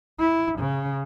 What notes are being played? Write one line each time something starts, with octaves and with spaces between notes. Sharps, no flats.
E4
C#3